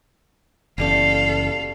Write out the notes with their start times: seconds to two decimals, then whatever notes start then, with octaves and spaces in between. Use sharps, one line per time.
0.78 F#1 B2 E3 G3 A3 C#4 A4 F5